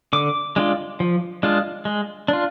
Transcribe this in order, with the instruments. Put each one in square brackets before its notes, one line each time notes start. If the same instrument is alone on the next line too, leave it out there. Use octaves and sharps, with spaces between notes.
[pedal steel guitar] D3 D6
G#3 D4 F4
F3
G#3 D4 F4
G#3
D4 F4